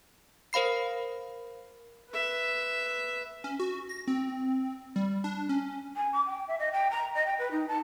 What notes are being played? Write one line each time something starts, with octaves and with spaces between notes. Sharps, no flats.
A#4 C5 F5 B5 C7
B4 E5
C#4
F#4
A#6
C4
G3
D4
C#4
G#5
D6
G5
E5
D#5
G5
A#5
D#5
G5
B4
D#4
A5